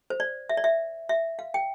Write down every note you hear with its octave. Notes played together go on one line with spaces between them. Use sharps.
C5
D5
E5
D5
E5
E5
F5
G5